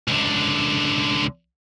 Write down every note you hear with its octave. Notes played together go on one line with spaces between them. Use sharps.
C#2 D3